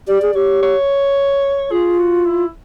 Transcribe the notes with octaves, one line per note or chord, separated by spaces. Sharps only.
G4 D5
G#4
G4 C#5
C#5
F4 G#4
F#4
E4